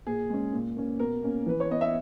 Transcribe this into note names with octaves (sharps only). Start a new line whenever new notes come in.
A#2 G#4
G#3 C#4
A#2
A#3 C#4
B2 A#4
A#3 C#4
E3 B4
C#5
B3 D#5
E5